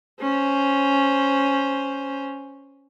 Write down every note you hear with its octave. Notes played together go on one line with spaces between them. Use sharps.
C#4 C5